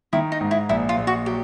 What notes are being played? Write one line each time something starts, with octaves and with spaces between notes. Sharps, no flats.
D#3 E4
D#4
G#2
E4
A#1 E4
F4
A#1
F#4
F#3 G4